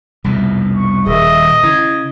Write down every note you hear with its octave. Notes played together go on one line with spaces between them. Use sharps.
C2 F2 B2
C#6
D#1 G#4 A#4 D#5 E5
C#3 E4 G#6